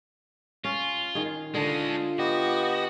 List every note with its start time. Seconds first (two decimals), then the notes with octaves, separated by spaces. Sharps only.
0.64 C#4 F4
1.15 D#3 G#4
1.54 D3 G#3 C#4 F4 A4 D#6
2.18 B3 F#4 G4 D#5